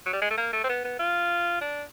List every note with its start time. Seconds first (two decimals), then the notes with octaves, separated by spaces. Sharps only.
0.06 F#3
0.13 G3
0.22 G#3
0.30 A3
0.38 A#3
0.53 A3
0.64 C4
0.69 B3
0.84 B3
0.99 F4
1.61 D4